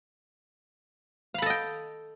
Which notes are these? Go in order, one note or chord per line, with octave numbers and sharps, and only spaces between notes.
A4 D#5 F5 G5 B5